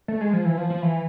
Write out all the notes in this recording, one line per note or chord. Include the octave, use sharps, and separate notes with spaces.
A3
G#3
F3
E3
F3
F3
E3